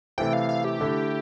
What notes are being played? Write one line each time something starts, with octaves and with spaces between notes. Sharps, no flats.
C3 E3 A3 E4 G5
F5
F5
G4
D3 A3 E4